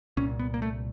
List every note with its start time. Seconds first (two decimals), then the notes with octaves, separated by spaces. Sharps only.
0.17 C2 A#2 C#4
0.39 B3
0.54 A#3
0.62 A3